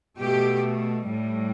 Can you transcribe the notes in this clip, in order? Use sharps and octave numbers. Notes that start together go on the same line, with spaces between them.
B2 A3 G4
A2 G3